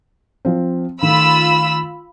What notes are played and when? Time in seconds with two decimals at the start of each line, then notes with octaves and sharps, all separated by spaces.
0.45 F3 C4
1.02 D#3 A3 F4 B5 E6